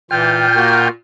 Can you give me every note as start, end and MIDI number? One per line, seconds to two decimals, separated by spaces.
0.11 0.87 46
0.11 0.47 52
0.11 0.87 65
0.11 0.88 79
0.11 0.87 89
0.56 0.89 58
0.56 0.89 66
0.56 0.89 70